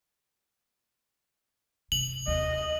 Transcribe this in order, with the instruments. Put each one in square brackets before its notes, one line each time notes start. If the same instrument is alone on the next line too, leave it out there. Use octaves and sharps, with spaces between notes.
[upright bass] C3 [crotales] F#7
[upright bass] D#2 [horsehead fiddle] D#5